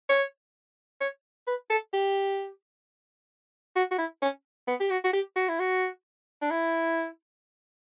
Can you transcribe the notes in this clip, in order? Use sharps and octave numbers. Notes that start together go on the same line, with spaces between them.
C#5
C#5
B4
A4
G4
F#4
F#4
E4
C#4
B3
G4
F#4
F#4
G4
F#4
E4
F#4
D4
E4